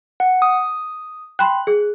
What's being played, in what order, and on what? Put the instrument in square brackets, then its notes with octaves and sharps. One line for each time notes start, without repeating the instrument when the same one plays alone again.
[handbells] F#5
D#6
[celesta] G5 B5 C6 [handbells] F#6
[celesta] G#4